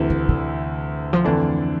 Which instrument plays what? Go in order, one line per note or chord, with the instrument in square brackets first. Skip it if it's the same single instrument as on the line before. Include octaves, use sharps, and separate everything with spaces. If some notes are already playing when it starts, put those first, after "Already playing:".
Already playing: [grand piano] D2 C3 E3 A3 E4
[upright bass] D3
D3
F3
[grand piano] F2 D3 A3 D4 [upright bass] E3